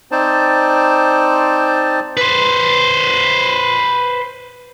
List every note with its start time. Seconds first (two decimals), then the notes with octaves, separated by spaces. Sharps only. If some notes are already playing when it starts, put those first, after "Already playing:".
0.12 C4 D#4 C5 D5 A5
2.17 B4 C5